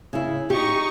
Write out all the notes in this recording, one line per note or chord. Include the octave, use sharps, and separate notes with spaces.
C#3 E4
D#4 G4 C#6